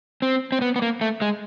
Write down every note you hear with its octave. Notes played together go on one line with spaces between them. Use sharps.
C4
C4
B3
B3
A#3
A3
G#3